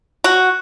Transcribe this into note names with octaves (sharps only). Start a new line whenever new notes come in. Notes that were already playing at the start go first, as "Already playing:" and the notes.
F#4